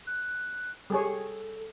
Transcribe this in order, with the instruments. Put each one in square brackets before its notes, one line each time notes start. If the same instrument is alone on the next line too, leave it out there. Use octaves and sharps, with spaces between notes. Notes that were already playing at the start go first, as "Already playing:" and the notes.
[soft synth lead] F#6
[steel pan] G3 G#4 C#5 [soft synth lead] A4